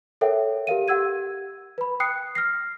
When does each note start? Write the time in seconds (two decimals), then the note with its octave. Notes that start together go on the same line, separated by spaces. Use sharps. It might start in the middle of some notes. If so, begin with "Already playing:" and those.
0.21 A4 A#4 C#5 E5 F#5 G5
0.67 G4 A#4 F5 D#7
0.88 G4 F#5 E6 G#6 D#7
1.78 B4 B5
2.00 G5 D#6 F#6 C7 C#7
2.35 F6 A#6 C7